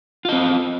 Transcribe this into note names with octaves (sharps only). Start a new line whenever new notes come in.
C4 F4 D#5